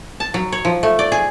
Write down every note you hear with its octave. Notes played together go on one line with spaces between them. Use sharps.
A5
F#3
C#5
F3
A3
D5
G#4